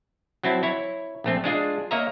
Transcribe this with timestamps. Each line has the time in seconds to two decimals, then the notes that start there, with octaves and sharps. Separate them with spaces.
0.44 F#3 C4 E4 A5
0.63 E4 C#5
1.24 A#1 A3 C4
1.44 G#3 D4 F4 G#4
1.91 A#3 C#5 D#5 E5 A#5